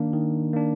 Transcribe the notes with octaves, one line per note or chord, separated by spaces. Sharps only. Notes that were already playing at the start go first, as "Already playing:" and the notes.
Already playing: D#3 A#3 D4
D#3
A#3 D4